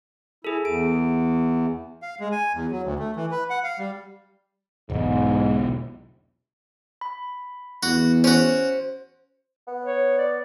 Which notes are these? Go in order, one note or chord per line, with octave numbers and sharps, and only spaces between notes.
E4 G#4 A4
E2 D7
F5
G#3
G#5
E2
F#3
D2
A3
E3
B4
F#5
F5
G3
E1 B1 G#2
B5
E2 F#4
C#4 F#4 C5
B3
C#5
D5